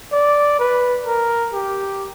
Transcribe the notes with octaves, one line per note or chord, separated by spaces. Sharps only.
D5
B4
A#4
G4